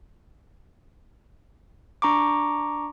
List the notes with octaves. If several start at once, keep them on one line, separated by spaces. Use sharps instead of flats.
D4 A#5 C#6 D6